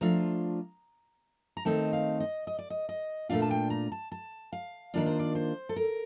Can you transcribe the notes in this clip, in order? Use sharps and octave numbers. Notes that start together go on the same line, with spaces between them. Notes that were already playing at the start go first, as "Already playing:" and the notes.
F3 A3 D4 F4 A#5
A#5
D#3 A3 C4 D#4 A5
F5
D#5
D#5
D5
D#5
D#5
A#2 A3 D4 F4 F5
A5
G5
A#5
A5
A5
F5
D#3 A#3 D4 F4 D5
C5
D5
C5
A4
A#4